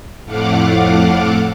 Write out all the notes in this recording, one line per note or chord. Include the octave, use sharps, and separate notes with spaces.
F2 A2 A3 F5 F#5 D6